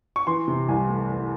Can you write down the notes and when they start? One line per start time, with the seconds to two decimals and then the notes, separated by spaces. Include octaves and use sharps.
0.16 C#6
0.27 E3 C6
0.48 C3
0.68 C2 G#5
0.89 A3
1.10 E3